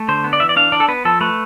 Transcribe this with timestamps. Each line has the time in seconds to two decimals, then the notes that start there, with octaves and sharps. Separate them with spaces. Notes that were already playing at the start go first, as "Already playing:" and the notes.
Already playing: A3
0.08 D3 C5
0.24 B3
0.33 D5
0.40 E3 E5
0.49 D5
0.56 D4 F5
0.72 D4 D5
0.80 A4
0.88 B3 B4
1.05 F3 A4
1.21 A3 B4